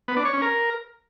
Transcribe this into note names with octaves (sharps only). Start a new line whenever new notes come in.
B3
D4
C#5
C#4
A#4